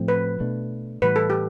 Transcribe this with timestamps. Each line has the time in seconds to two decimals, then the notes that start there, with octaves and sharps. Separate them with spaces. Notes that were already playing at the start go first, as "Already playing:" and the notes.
Already playing: A2 F3 A3 C4
0.08 B4
0.40 B2 A3 D4
1.02 A2 E3 G3 B4
1.16 A4
1.30 G4